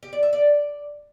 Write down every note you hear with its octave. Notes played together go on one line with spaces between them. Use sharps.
G4
D5
E5
D5